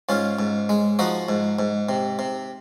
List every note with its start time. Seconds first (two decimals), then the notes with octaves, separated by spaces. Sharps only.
0.09 G#2 C#4 F4
0.39 G#2
0.69 G#3
0.99 F3 D#4 F#4
1.28 G#2
1.59 G#2
1.89 C3
2.19 C3